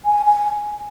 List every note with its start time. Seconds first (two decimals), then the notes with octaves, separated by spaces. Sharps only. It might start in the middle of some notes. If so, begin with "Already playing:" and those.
0.05 G#5
0.26 G#5